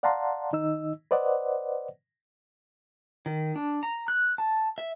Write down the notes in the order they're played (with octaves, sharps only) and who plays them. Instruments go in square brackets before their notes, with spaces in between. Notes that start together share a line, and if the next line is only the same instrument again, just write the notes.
[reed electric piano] D5 F5 F#5 A5 A#5 C6
D#3 D#4 D#5 E6
B4 C5 D5 D#5 F#5
[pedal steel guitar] D#3
D4
A#5
F#6
A5
E5